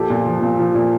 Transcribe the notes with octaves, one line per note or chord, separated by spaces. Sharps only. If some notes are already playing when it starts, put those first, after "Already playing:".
Already playing: A#2 F3 G4 A4
A#2
F3
A#2
F3
A#2